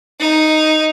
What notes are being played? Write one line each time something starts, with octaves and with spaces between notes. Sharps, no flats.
D#4